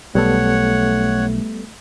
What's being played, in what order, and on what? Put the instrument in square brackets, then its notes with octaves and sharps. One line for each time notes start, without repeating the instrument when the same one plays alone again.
[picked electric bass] B1 [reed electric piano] G3 B3 A4 [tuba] A3 [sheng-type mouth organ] C#5 F#5